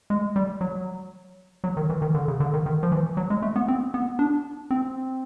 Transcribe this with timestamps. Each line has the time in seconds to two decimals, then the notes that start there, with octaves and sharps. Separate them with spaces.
0.10 G#3
0.36 G3
0.61 F#3
1.64 F#3
1.77 D#3
1.90 E3
2.02 D#3
2.15 D3
2.28 C#3
2.40 D3
2.54 D#3
2.66 D#3
2.83 F3
2.92 E3
3.17 F#3
3.30 G#3
3.42 A3
3.56 B3
3.68 C4
3.94 B3
4.19 D4
4.71 C4